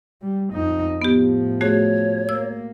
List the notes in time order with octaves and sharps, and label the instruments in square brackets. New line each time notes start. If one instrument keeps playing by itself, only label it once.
[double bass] G3
F2 D#4
[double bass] A2 F3 [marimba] B3 G4
[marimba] A3 F#4 G#4 [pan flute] C#5
[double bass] A#3 [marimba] E6